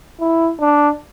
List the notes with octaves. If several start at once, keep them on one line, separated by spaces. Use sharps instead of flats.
E4
D4